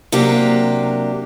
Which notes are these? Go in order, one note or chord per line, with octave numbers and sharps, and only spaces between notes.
C3 F#3 A#3 D4 G4